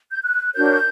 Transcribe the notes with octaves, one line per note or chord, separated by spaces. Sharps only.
G6
F#6
D4 F#4 A#4 C#5 G6